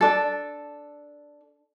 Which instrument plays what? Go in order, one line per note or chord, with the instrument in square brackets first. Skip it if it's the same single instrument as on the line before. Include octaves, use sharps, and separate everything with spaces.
[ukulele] D4 A4